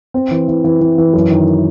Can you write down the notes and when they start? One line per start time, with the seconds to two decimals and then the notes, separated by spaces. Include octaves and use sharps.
0.14 C4
0.31 E3
0.48 E3
0.64 E3
0.81 E3
0.98 E3
1.14 F#2
1.31 D#3